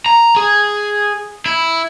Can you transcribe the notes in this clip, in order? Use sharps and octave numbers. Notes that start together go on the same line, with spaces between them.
A#5
G#4
E4